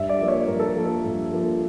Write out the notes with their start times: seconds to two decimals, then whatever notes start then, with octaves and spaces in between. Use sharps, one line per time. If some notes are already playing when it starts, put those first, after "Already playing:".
Already playing: G2 E5
0.09 D5
0.19 F3 A#3
0.28 C#5
0.47 G2 A#4
0.60 A4
0.76 F3 A#3
0.86 A4
1.05 G2
1.33 F3 A#3